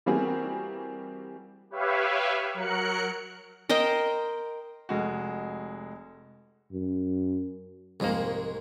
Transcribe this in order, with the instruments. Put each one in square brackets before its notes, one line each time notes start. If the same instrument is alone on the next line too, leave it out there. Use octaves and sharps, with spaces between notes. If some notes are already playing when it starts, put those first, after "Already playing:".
[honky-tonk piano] E3 G3 A#3 C4 F#4 G#4
[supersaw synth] G4 B4 C#5 E5 F5
F#3 A#4 F#6 C#7
[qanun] A#4 C5 D#5 G5
[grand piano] F1 G#3 F#4
[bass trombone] F#2
[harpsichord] C2 G#2 G#3 [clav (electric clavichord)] F2 A#3